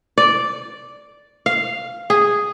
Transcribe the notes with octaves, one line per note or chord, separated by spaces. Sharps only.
D5
F5
G#4